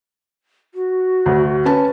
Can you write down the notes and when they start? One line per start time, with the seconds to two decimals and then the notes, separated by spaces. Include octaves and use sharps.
0.74 F#4
1.26 D2
1.65 C#4 B4 A5